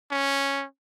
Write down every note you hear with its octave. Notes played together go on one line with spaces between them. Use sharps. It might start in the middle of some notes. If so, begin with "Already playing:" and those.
C#4